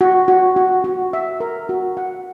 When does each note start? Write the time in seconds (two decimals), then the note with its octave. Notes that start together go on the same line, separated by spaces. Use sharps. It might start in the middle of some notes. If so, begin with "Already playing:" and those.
0.01 F#4
0.28 F#4
0.56 F#4
0.84 F#4
1.13 E5
1.40 A#4
1.69 F#4
1.97 F#5